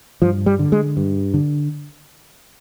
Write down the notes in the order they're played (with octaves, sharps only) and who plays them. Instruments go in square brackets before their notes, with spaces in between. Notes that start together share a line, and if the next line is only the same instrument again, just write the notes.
[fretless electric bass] G2 F3
G3
D3
G#3
G2
D3